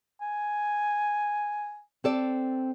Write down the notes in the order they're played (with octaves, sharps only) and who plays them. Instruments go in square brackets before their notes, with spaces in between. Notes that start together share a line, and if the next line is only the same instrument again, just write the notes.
[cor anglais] G#5
[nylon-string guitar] C4 A4 D5